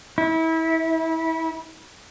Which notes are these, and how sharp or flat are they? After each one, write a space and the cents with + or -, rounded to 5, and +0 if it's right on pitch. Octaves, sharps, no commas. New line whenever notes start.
E4 -30